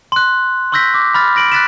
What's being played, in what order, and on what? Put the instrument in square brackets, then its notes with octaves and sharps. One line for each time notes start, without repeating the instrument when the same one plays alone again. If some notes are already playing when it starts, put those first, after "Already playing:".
[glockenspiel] C6 F#6
C6 C#6 E6 G6 A#6 B6
D6
B5 F6 A6
A#6 D7 F#7
F#6 A6 B6 E7